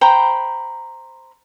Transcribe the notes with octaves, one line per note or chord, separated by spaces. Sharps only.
C5 G5 A#5 B5